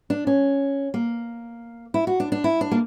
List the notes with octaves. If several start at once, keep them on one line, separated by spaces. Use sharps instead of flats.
D4
C#4
A#3
E4
F#4
D4
D4
E4
D4
A#3